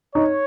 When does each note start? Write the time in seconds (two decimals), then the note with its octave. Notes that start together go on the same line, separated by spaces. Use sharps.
0.15 D#4 C#5